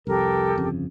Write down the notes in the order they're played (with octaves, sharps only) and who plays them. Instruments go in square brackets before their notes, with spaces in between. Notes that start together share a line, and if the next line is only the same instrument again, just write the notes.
[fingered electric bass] C2 F2 [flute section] G4 A4 A#4
[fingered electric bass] G1 F2 C#3